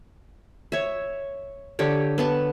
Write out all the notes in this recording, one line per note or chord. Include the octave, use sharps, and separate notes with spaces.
C#5 E5
D3 G4 C#5
B3 B4 A5